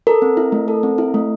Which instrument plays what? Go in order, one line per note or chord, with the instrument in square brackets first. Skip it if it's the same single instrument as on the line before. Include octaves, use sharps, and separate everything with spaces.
[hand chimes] A4 A#4
C4
E4
A3
A4
C4
E4
A3